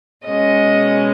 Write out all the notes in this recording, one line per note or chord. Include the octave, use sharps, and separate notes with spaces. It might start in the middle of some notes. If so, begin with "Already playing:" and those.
B2 G#3 C#4 D#5